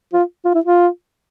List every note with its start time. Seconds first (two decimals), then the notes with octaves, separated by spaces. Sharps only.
0.13 F4
0.45 F4
0.55 E4
0.65 F4